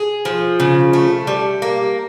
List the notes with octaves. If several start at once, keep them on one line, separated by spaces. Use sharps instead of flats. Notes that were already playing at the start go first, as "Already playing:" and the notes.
Already playing: G#4
F3
C#3
A3
G3
A#3